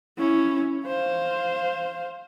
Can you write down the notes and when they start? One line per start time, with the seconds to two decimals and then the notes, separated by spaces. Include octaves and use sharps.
0.18 C#4 E4
0.87 C5 F5